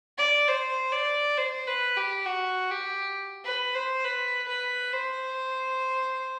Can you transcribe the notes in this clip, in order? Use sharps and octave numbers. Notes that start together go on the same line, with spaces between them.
D5
C5
D5
C5
B4
G4
F#4
G4
B4
C5
B4
B4
C5